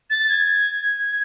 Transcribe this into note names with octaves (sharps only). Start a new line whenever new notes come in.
A6
G#6